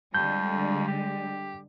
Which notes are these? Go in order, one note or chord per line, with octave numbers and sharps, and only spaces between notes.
F2 D3 G3 G#3 G6
G4